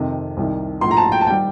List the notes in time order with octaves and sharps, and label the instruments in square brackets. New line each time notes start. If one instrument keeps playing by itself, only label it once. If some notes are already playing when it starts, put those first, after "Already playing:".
Already playing: [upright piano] F2 C3 D#3
C2 C3 D#3
A#1 A2 F3 C6
A#5
A5
G5
A5
D#3 G3 G5